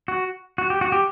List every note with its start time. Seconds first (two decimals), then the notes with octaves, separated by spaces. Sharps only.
0.08 F#4
0.58 F#4
0.70 G4
0.81 F#4
0.92 G4